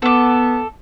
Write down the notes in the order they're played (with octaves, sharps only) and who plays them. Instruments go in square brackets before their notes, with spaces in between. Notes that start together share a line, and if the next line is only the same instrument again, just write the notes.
[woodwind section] B3 [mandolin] A4 D6